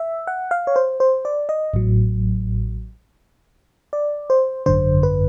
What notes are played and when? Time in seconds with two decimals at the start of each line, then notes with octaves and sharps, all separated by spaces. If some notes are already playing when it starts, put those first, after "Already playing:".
Already playing: E5
0.27 F#5
0.51 F5
0.67 C#5
0.76 C5
1.00 C5
1.25 D5
1.49 D#5
1.74 A1 A2 F#3
3.93 D5
4.30 C5
4.66 G#1 F#2 D3 C5
5.03 B4